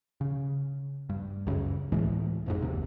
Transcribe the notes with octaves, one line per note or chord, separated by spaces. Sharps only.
C#3
G2
C#2 F#2 C#3
D2 A2 E3 G#3
G#1 F2 G#2
F#1 D#2 C3